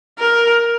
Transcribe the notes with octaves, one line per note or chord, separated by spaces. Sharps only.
A#4